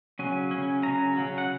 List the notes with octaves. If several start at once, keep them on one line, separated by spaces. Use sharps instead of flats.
C#3 F#3 C#4 G#5
C#3 F#3 C#4
C#3 F#3 C#4 A#5
C#3 F#3 C#4
F#5